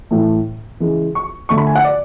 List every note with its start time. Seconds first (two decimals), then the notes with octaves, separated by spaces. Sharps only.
0.11 A2 E3 A3
0.80 C#3 E3 G#3
1.15 C#6
1.49 D3 A3 C#6
1.58 B5
1.67 G#5
1.75 F#5
1.84 D5